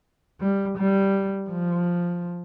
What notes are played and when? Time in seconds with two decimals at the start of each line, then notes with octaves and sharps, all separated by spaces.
0.41 G3
0.78 G3
1.50 F3